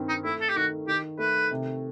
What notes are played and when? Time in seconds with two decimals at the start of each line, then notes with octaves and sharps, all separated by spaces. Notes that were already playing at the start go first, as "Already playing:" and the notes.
Already playing: G2 D#3 C4
0.09 D#4
0.24 A3 E4
0.41 A4
0.49 G4
0.56 D#3 F#4
0.87 D#3 G4
1.19 A3 B4
1.51 C3